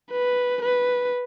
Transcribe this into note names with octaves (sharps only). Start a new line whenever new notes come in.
B4
B4